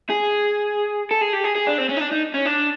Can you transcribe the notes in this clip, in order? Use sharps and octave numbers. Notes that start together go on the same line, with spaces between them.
G#4
A4
G#4
G4
G#4
G#4
D4
C4
C#4
D#4
D4
D#4
C#4
D4